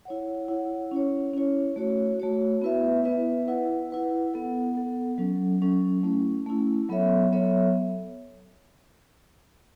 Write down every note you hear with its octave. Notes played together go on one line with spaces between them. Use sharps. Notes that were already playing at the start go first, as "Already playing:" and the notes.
E4 C#5 F#5
E4 C#5 F#5
C#4 E4 C#5
C#4 E4 C#5
A3 F#4 C#5
A3 F#4 C#5
B3 E4 B4 E5
B3 E4 B4 E5
E4 B4 F#5
E4 B4 F#5
B3 A4 F#5
B3 A4 F#5
F#3 C#4 A4
F#3 C#4 A4
A3 C#4 E4
A3 C#4 E4
F#3 B3 A4 C#5 E5
F#3 B3 A4 C#5 E5